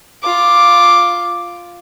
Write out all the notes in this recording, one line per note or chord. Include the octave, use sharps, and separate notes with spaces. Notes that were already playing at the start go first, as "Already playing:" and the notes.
F4 D6